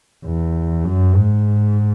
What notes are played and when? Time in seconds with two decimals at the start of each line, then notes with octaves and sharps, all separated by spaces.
0.25 E2
0.85 F#2
1.15 G#2